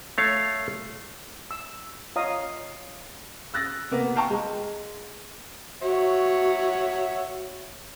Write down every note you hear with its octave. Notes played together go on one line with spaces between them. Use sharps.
A3 C#5 F5
E6
F4 C#5 D#5 F5 A#5 D#6
E6 F#6 A6 A#6
C3 A#3 B3
F5 G5 A5 A#5 C#6
G#3
F#4 C#5 E5 F#5